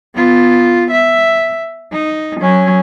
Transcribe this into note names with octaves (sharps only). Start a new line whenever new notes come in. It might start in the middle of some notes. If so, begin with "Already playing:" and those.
B3 F4
E5
D#4
F#3 C#4